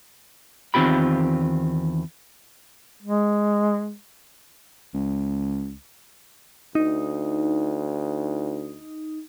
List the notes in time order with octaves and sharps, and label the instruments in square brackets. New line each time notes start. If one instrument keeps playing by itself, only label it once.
[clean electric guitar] E2 D#3 C4 F4 G4 B5
[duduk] G#3
[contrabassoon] C#2
[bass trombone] D2 [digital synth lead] D#4